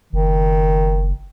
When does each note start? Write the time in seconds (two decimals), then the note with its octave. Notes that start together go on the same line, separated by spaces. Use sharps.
0.13 F#1 D#3